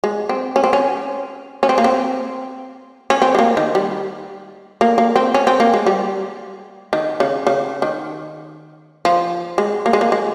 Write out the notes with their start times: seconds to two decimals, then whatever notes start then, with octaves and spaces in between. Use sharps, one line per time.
0.04 G#3
0.29 C4
0.56 C#4
0.64 C4
0.73 C#4
1.63 C#4
1.69 C4
1.78 A#3
1.84 C4
3.10 C#4
3.22 C4
3.35 G#3
3.39 A#3
3.57 D#3
3.75 G3
4.81 A#3
4.98 A#3
5.16 C4
5.34 C#4
5.47 C4
5.60 A#3
5.74 G#3
5.86 G3
6.93 D#3
7.20 C#3
7.47 C#3
7.82 D#3
9.05 F3
9.58 G#3
9.86 A#3
9.93 G#3
10.01 A#3
10.12 G#3